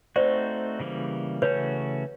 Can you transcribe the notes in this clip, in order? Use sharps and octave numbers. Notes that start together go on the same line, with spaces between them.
A3 C4 D#4 F#4 C5 D5
C#3 E3 G3 A#3
C#3 E3 A3 C#4 F#4 B4 C#5